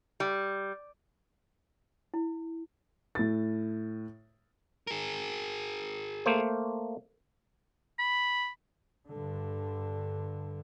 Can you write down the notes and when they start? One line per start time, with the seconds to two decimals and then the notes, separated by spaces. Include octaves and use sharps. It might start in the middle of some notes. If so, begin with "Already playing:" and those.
0.20 G3
2.14 E4
3.15 A2 A6
4.87 G#4 A#4
6.26 A3 A#3 C5
7.99 B5
9.10 G2 D3